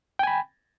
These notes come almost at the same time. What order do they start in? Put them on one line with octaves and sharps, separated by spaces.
G5 G#5 B5